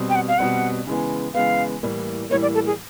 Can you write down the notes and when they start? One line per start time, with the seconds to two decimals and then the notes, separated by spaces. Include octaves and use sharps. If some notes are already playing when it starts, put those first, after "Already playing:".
Already playing: B2 G3 C4
0.10 G5
0.15 F#5
0.28 F5
0.38 B2 G3 C4 F#5
0.87 C#3 E3 G#3 B3
1.34 C#3 E3 G#3 B3 F5
1.83 A2 E3 G3 A#3
2.30 A2 E3 G3 A#3 C#5
2.42 D5
2.54 A4
2.67 G#4